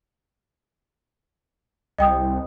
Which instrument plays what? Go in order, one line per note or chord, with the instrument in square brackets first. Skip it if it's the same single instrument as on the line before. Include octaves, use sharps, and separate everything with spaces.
[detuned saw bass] C2 [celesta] D#5 G5 D#6